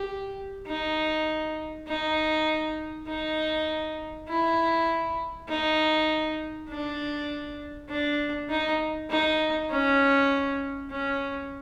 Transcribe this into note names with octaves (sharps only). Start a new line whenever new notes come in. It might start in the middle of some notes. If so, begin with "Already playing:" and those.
Already playing: G4
D#4
D#4
D#4
E4
D#4
D4
D4
D#4
D#4
C#4
C#4